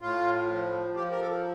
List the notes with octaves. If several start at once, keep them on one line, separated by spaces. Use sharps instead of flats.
A2 F4
F3
F3 G4
A#4
A4